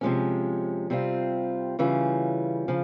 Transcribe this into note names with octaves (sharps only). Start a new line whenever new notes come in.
C3 F3 G#3 C#4
C3 G3 C4 F4
C#3 E3 G3 C#4 F4
C#3 F3